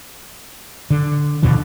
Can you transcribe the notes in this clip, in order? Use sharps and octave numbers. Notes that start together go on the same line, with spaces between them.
D3
D#2 B2 D3 F3